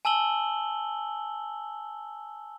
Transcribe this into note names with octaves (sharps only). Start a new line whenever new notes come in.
G#5 A5 E6 F#7 G7